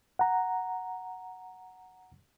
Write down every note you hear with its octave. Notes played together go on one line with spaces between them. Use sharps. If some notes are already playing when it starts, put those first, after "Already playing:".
F#5 A#5